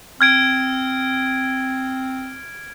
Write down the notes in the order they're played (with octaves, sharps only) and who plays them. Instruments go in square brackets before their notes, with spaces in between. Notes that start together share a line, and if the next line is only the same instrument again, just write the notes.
[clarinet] C4 [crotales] F6 G#6 D7